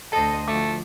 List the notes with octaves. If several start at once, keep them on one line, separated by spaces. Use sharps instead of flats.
D2 A4 C5 D#5 A5
D2 F3 A3 D6